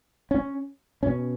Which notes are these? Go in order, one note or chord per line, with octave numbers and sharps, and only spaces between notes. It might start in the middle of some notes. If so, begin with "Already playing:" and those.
C#4
B2 C#4